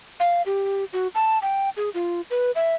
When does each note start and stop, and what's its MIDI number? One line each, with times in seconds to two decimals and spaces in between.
0.20 0.42 77
0.46 0.84 67
0.93 1.07 66
1.15 1.38 81
1.42 1.69 79
1.77 1.89 68
1.94 2.21 65
2.30 2.51 71
2.55 2.75 76